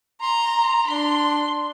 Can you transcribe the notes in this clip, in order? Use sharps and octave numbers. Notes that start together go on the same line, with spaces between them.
A#5 C6
D4 C6